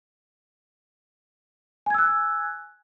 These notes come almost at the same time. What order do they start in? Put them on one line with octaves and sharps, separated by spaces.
G#5 G#6 E6 F#6